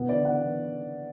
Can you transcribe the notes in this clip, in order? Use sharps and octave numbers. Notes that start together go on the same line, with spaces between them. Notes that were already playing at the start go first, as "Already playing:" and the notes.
Already playing: B2 B3
D3 D5
B3 F#5
B3